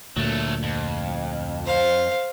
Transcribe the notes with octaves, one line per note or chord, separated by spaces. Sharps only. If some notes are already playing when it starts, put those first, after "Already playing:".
D2 A#2 F#3 A3
F2
C5 F5